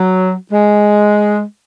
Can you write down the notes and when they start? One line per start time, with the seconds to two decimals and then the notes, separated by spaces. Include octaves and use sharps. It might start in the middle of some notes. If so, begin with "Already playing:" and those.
Already playing: F#3
0.52 G#3